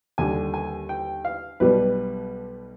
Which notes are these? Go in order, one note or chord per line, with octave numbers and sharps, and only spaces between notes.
D#2 D3 G3 G#5
G#5
G5
F5
B1 B2 G3 B4